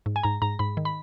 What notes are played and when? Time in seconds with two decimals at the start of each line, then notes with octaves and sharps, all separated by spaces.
0.06 G#2
0.16 G#5
0.23 G#2 A#5
0.42 G#2 A#5
0.59 G#2 B5
0.77 D#3
0.85 B5